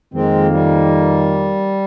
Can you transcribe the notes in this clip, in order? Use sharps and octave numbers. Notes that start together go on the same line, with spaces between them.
F2 D#3 G#3 A#3 C4
G3